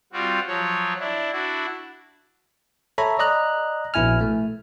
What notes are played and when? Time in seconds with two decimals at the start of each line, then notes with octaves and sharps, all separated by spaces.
0.13 G3 C4 F4 F#4
0.47 F3 F#3 C#5
0.99 D4 E4
1.33 D4 E4 F#4
2.98 A4 C#5 E5 A#5 B5
3.19 D5 D#5 A#5 F#6
3.94 A#1 B2 E4 G#5 F6
4.21 A3